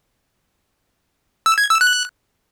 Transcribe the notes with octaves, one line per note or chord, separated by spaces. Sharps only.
E6
G#6
E6
F#6